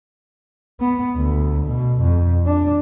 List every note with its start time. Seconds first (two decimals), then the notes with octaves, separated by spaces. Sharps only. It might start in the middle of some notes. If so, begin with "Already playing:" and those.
0.80 B3
1.16 D2
1.66 B2
2.01 F2
2.46 D4